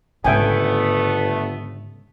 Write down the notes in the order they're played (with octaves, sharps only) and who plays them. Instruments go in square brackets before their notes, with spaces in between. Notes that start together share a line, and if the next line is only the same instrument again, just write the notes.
[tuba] G1 [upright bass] G#2 C#3 [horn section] A3 B3 [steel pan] E5 G5 G#5